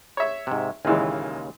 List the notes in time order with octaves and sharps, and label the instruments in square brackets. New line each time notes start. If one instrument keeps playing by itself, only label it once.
[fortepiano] C#5 E5
[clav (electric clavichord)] G#2 C3
[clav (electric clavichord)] D#2 C#3 [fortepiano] A#2 E3 G#3